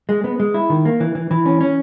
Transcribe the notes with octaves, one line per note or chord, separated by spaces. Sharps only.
G#3
B3
G#3
E4
D#3
A#3
E3
E3
E3
C#4
C#4